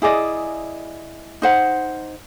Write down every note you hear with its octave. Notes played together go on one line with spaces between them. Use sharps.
E4 G#4 D5 D#5
D#4 C5 F#5